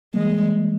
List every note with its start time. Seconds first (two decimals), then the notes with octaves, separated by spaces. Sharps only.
0.14 E3 G3 G#3 A#3